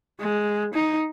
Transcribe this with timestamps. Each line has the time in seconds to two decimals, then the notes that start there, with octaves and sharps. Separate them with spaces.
0.20 G#3
0.74 D#4